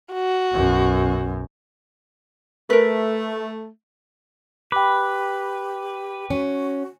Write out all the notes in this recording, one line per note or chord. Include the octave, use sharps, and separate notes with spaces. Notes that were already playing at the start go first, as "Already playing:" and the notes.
F#4
B1 F#2
A3 A#4 B4
G4 B4 G5 B5 D6
C#4 F#4